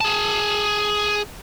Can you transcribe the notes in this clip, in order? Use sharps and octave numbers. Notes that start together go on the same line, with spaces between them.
G#4 A5